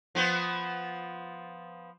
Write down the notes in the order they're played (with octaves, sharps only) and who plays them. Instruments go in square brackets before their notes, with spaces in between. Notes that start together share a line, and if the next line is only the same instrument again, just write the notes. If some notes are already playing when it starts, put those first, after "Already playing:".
[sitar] F3 B3 C5